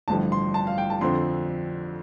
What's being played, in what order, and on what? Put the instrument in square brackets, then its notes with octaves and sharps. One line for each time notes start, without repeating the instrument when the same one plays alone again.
[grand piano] A1 G2 D3 F3 A5
C6
A5
F5
G5
A5
F2 D3 F3 C4 C6